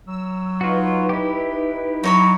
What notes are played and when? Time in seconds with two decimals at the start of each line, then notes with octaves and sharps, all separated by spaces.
0.07 F#3 E6
0.61 D#4 F4 F#4 B4
1.09 E4 G4
2.04 F#3 D#4 C#5 E5 B5 D6